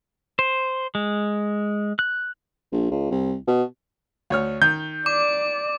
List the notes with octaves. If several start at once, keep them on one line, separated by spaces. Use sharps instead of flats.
C5
G#3
F#6
A#1
C#2
C2
B2
D2 C#5 F6
D#3 G6
D5 D6